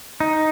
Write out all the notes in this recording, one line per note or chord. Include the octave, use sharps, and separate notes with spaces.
D#4